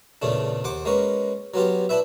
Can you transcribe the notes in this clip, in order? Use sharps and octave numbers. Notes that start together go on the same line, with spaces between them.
E2 A#2 C#3 A3 D4
D#2 C5 F#5 D6
G#3 A#3 C#4 B4
F#3 B3 F4 G4
D4 E4 B4 E5